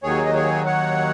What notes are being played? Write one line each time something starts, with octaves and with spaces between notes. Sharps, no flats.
D#2 D#3 F#3 G#4 C#5
D#5
G#4 C#5
C#5 F#5